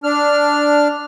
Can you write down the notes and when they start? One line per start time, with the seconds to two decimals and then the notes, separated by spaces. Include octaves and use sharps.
0.04 D4 F6